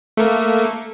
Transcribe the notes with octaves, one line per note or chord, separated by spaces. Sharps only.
A3 A#3